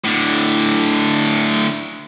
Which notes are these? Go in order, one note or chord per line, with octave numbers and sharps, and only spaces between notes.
A2 D3